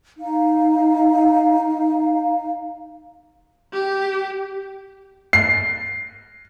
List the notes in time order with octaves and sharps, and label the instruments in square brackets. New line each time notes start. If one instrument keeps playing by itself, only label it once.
[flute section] D#4 F5
[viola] G4
[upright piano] C7